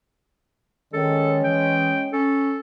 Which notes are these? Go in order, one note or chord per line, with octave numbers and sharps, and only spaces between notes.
D#3 G#3 C#4 A4
E3 G5
C#4 A4